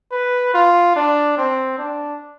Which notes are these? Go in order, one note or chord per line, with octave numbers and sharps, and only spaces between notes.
B4
F4
D4
C4
D4